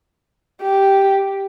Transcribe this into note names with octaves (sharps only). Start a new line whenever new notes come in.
G4